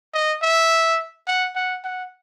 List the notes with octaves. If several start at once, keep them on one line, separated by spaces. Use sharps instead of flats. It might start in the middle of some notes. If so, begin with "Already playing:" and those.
D#5
E5
F#5
F#5
F#5